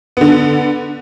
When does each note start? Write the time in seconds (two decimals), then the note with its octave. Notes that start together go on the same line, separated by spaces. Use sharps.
0.17 D3 B3